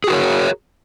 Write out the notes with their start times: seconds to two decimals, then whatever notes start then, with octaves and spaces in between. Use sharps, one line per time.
0.04 G#4
0.07 F#4
0.10 A#4
0.13 C#5